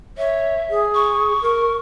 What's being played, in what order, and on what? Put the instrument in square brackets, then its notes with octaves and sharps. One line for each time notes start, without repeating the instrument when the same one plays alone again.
[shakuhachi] C#5 [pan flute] E5
[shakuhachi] G#4
[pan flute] C#6
[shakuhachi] A#4